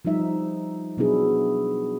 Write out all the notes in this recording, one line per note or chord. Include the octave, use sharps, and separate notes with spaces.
F3 G3 D#4 E5
B2 F#3 B3 D4 E4 G#4